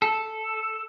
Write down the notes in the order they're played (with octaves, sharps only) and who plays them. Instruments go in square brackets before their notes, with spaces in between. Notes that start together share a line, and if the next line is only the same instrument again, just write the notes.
[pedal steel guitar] A4